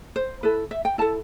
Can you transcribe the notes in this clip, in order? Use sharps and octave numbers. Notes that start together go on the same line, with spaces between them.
C5
E4 A4 B4
E5
G5
E4 A4 A5